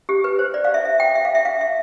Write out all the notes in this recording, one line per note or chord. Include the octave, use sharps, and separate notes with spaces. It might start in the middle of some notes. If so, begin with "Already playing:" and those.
G4
B4
C5
D5
F5
E5
E5
G5
E5
F5
E5
F5
E5